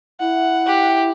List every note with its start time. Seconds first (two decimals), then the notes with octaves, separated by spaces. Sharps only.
0.20 E4 F#5
0.67 G4